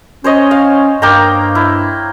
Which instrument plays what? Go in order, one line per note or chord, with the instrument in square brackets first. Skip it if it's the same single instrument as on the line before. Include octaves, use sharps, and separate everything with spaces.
[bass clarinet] C#4 [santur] C5 C#5 D#5
[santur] F5
[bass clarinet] G2 [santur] A#3 G5 A#5
[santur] E4